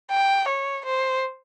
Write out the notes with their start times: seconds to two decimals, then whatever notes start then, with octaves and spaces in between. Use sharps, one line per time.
0.12 G5
0.48 C#5
0.85 C5